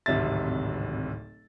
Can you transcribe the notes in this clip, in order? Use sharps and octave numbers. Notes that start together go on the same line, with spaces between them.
D1 G#1 C3 E5 A6